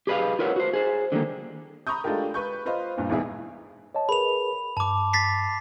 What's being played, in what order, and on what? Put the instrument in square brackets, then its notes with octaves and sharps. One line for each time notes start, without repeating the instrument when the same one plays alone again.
[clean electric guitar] G4 G#4 B4 C#5 D#5 F5
F4 A#4 B4 C#5 F#5
F#4 C5
G#4 C5
D3 D#3 G3 A#3
[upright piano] A#5 B5 C#6 D#6 G6
G#3 A3 D4 F4 G4 A#4
B4 B5 C#6 G6
F4 B4 C5 D#5 F5
G2 A#2
G#1 E2 B2 G#4 E5
[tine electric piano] C#5 D#5 A5
[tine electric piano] G#4 A#4 B4 [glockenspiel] B5 F7
[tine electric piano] G2 [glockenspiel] A5 D6
[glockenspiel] A6 B6 C7